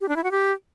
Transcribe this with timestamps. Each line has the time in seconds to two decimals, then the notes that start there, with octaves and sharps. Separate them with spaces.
0.01 G4
0.09 D4
0.16 E4
0.24 F#4
0.31 G4